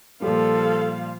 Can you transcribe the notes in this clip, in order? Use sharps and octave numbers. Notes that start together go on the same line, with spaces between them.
A#2 F3 G3 A4 F5